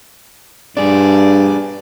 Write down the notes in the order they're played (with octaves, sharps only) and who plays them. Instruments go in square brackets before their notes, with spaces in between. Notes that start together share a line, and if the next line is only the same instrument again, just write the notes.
[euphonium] G2 [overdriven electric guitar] D4 G#4 [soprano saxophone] D5